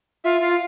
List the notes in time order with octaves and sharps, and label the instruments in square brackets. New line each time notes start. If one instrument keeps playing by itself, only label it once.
[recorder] F4 [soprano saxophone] E5
[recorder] F4
[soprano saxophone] F5